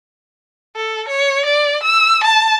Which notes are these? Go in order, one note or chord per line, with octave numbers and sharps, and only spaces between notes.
A4
C#5
D5
E6
A5